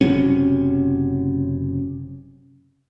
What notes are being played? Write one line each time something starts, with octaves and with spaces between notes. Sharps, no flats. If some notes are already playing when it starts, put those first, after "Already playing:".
F#1 C3 F#3 C#4